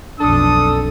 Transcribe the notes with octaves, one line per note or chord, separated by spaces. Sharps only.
B1 F2 D4 A4 D#6